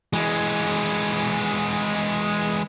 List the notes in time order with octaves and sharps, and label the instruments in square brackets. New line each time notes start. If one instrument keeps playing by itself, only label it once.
[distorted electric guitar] E3 G#3